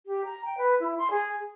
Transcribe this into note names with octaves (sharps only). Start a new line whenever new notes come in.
G4
A#5
G5
B4
E4
C6
G#4